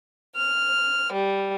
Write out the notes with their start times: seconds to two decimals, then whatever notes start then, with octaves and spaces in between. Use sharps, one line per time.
0.36 F6
1.13 G3